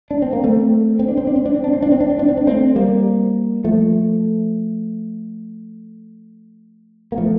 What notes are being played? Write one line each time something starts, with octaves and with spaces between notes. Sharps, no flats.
D4
C4
A#3
A3 C4
C4
D4
C4
D4
C4
D4
C4
D4
C4
D4
C4
D4
C4
D4
C4
D4
A3 C4
G3 A#3
F3 A3
A#3
F3 A3